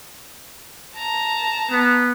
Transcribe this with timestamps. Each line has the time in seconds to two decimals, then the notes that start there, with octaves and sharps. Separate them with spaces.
0.96 A5 A#5
1.71 B3